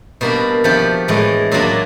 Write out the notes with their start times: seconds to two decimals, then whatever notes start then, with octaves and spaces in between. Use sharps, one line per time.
0.21 B2 G3 A#3 D4
0.64 F3 A3 D4 G4
1.08 A2 E3 G#3
1.52 A#2 F#3 A#3 D4